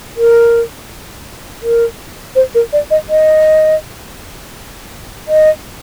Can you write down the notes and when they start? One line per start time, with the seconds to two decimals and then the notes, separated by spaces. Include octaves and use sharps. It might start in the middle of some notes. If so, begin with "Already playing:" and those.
0.17 A#4
1.63 A#4
2.36 C5
2.55 A#4
2.73 D5
2.91 D#5
3.09 D#5
5.28 D#5